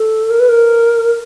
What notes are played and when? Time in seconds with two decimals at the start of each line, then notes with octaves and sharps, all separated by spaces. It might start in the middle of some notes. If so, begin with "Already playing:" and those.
Already playing: A4
0.30 A#4
0.40 B4
0.49 A#4